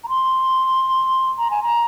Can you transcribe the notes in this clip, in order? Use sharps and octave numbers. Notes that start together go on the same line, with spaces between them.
A#5
C6
A#5
G#5
A#5